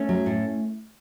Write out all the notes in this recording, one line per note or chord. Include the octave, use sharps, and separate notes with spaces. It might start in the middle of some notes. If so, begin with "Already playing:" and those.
Already playing: A3 C#4
F#3
A2